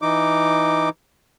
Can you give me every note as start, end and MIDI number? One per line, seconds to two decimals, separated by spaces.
0.02 0.89 52
0.02 0.89 63
0.02 0.89 86